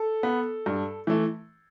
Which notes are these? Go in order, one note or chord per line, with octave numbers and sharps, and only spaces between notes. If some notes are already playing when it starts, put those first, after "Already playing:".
Already playing: A4
B3
G2
E3 A3